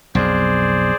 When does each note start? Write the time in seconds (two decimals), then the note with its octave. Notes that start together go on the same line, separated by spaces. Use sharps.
0.15 B1 F2 G#4 C5 D5